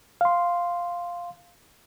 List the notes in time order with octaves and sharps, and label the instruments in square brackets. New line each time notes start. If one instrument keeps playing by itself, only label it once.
[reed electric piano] F5 C6